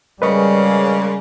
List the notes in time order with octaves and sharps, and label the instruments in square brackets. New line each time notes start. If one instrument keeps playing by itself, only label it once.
[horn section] C#3 G#3 A#3 [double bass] G3 [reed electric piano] B4 D#5 C#6 [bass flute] C#5